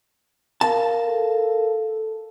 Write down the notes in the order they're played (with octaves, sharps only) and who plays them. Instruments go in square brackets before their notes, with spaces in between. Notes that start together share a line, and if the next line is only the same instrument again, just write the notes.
[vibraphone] A#4 F5 [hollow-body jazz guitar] A5
[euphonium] A4